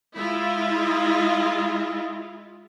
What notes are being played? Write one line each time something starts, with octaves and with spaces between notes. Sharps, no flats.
G#3 E4 F4